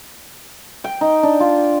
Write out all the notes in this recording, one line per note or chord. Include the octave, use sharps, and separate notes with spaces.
G5
D#4
D4
F4